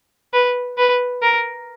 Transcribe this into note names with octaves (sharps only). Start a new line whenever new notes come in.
B4
B4
A#4